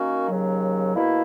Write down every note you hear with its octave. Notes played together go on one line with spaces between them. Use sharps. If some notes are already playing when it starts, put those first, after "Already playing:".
Already playing: D#3 A#3 C#4 F#4
D#2 C#3 F#3
B2 A#3 E4